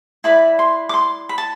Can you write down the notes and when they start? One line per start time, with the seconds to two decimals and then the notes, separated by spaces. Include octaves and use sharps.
0.24 E4 B4 D5 B5
0.59 C6
0.89 D6
0.94 C6
1.29 B5
1.38 A5